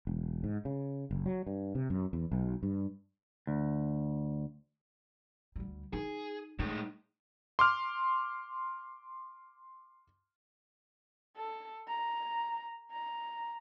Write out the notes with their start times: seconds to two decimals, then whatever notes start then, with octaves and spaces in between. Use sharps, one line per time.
0.07 E1
0.44 G#2
0.65 C#3
1.11 F#1
1.26 F#3
1.46 G2
1.75 C3
1.90 F#2
2.13 E2
2.31 B1
2.63 G2
3.47 D2
5.56 D2 G3
5.93 D#4 G#4
6.59 A2 G#3 D#4
7.59 C6 D6 F6
11.36 A4
11.88 A#5
12.92 A#5